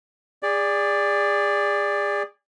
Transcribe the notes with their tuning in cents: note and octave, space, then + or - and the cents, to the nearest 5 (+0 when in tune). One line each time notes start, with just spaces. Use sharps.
G#4 -30 D5 +0